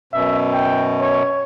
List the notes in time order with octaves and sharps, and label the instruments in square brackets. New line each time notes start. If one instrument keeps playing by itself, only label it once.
[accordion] F#2 B2 [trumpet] E5
[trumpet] G5
C#5